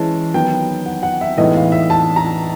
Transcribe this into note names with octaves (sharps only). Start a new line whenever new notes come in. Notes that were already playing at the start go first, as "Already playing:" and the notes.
Already playing: E3 G#3 C#4 A5
D#3 F#3 B3 G5
F#5
F#5
E5
A2 E3 G#3 B3 D#4 D#5
F5
E5
A5
A#5